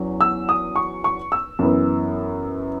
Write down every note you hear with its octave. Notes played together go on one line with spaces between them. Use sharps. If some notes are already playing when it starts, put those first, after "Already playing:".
Already playing: E2 F#3 C#4
E6
D#6
C#6
C#6
E6
F#2 E3 B3